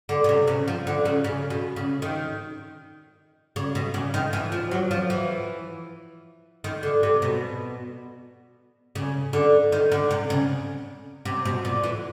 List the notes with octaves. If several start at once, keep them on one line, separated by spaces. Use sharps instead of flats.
D3
C#3
C3
C#3
F3
D3
C#3
C#3
B2
C#3
D#3
C#3
B2
C#3
D#3
E3
F3
F#3
F3
E3
D#3
D3
C3
B2
C#3
D3
D#3
D3
C3
C#3
C3
B2
A#2
E3